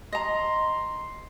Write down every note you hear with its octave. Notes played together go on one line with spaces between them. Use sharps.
D#5 A#5 C6